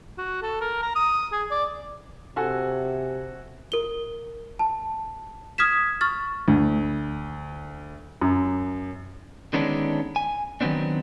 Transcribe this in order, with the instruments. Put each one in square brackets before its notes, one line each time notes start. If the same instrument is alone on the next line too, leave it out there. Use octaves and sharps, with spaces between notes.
[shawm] F#4
A4
A#4
A#5
D#6
G#4
D5
[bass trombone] C3 [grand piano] F#4 A4 G#5
[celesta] A#4 G7
A5
D#6 F6 G#6 B6 E7
C#6 F6 A6
[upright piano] D2
F#2
[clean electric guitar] D3 D#3 G#3 B3 C#4 D4
G#5
D#3 F#3 G#3 B3 C4 D4